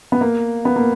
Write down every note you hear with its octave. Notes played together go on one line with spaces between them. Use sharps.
B3
A#3
B3
A#3